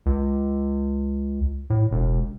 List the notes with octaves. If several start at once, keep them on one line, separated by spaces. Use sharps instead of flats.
C#2
A2
E1